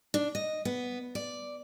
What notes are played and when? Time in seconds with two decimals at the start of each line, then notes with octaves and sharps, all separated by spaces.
0.14 D4
0.35 D#5
0.65 B3
1.15 D5